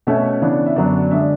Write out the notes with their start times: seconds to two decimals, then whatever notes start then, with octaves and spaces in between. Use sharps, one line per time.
0.07 B2 A3 C#4 E5
0.42 C#3 E3 B3 D4
0.66 E5
0.76 F#2 D3 F#3 B3 D4 D5
1.11 D3 G#3 D4 E5